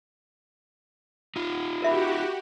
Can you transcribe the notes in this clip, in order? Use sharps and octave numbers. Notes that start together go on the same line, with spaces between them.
D#4 F4
F#4 G4 A#4 E5 B5